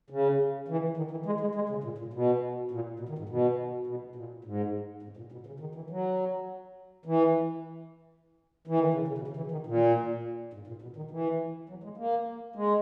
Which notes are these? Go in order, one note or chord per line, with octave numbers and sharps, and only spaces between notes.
C#3
E3
D#3
E3
G#3
G#3
G#3
C#3
A#2
A#2
B2
A#2
B2
D#3
G#2
B2
B2
A#2
G#2
G#2
A#2
B2
C#3
D#3
E3
F#3
E3
E3
D#3
C#3
C#3
B2
C#3
E3
D#3
A#2
G#2
A#2
B2
D#3
E3
F#3
G#3
A#3
G#3